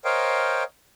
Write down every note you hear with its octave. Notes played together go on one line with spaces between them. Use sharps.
A#4 C5 C#5 D#5 F5 G5